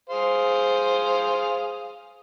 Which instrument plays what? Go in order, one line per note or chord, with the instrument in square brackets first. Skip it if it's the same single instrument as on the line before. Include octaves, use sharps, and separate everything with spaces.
[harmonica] G#4 C5 F5